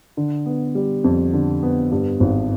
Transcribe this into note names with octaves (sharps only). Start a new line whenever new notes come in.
D3
B3
G3
F2
D3
B3
G2
G#1